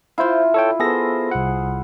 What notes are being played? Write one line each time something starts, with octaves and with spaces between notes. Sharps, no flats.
E4 F4 C5 F5
A4 C#5 G5
B3 G#4 A4 C5 A#6
C2 F#5